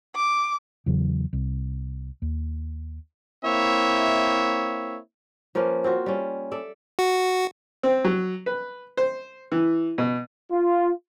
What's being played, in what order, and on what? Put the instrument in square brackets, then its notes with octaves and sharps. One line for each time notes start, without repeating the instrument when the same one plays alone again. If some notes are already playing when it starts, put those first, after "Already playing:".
[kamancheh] D6
[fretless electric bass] E2 C#3 F#3
C2
D#2
[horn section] A#3 C4 E4 C#5 E5
[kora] F3 A#3 C#4 B4
C4 F4 F#4
G3 C#4
A4 D5 E5
[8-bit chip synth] F#4
[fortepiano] C4
F#3
B4
C5
E3
B2
[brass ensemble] F4